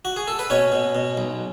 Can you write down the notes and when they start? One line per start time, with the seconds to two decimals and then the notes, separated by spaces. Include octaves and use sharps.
0.05 F#4
0.16 G#4
0.28 A4
0.39 B4
0.50 B2 C#4 C#5
0.72 B2
0.95 B2
1.17 B1